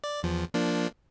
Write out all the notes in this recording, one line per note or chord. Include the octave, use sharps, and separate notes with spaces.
D5
E2 F3
F3 A#3 D4